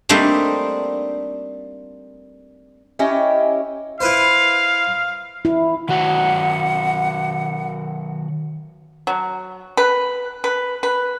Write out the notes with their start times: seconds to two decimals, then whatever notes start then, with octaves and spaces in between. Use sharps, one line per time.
0.09 G3 A3 A#3 C4 D4 D#4
2.99 C#4 E4 G4 D#5
4.01 E4 B4 C5 F5
5.45 E4
5.89 D#3 F#3 F#4 F#5
9.07 F#3
9.77 B4
10.44 B4
10.83 B4